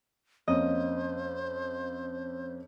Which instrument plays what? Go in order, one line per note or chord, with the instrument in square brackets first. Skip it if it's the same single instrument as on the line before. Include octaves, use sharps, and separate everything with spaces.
[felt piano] F2 A#3 C#4 [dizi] C5 [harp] D#5